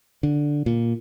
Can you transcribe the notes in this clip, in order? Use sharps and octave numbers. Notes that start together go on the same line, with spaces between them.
D3
A#2